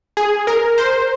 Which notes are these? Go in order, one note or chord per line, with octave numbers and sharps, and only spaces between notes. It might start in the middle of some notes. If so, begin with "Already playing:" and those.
G#4
A#4
C5